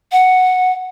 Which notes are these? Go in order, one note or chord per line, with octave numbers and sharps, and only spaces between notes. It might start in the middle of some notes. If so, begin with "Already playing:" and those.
F#5